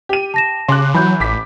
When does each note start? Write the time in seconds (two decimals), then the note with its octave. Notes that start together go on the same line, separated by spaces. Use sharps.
0.09 G4 D#7
0.34 A5 A#6 E7
0.68 C#3 C6 D6 F#6
0.94 E3 F#3 B5 G6
1.20 A1 D6 B6